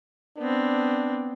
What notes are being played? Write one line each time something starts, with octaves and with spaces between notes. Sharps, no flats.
B3 C4 D4